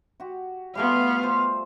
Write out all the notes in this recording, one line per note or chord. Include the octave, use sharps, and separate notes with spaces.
F#4 G4
G3 A3 B3 F4 F5
C5